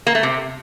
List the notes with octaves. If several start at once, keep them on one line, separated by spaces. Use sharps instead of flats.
A#3
A3
C3